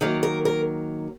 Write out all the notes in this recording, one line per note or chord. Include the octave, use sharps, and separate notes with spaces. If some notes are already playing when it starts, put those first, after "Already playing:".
D#3 F#3 A#3 A#4
A#4
A#4